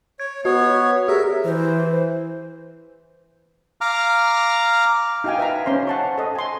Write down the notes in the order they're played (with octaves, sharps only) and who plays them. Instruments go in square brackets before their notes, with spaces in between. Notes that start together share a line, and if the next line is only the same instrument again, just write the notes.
[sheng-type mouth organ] C#5 [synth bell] G#6
[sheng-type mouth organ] B3 C#5 [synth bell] F#4 D#5
[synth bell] G4 G#4 [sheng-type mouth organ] A#4 E5
[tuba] E3 [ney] C5
[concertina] F5 A#5 D6 F6
[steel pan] D#4 F#4 F5 G5 G#5
B4 E5 F5 A#5
C#4 C5 C6
F#5 A5 C#6
A4 D#5
G#5 C6